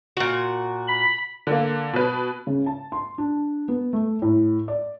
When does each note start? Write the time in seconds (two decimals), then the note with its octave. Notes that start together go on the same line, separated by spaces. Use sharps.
0.17 A#2 F#4
0.88 B5
1.47 D3 A#3
1.93 B2 B4
2.47 C#3
2.66 A5
2.92 C6
3.18 D4
3.68 B3
3.93 A3
4.22 A2
4.68 D5